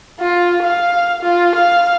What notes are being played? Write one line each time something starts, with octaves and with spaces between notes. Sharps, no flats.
F4
F5
F4
F5